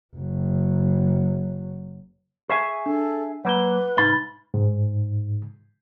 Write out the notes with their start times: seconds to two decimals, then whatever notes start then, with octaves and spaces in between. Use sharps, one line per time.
0.16 F#1 F#3
2.49 G#4 E5 G#5 C#6
2.86 D4 A4
3.45 F#3 A#3 B4 F#5 B5 G7
3.97 C2 G#2 D#4 B5 A6 G7
4.54 G#2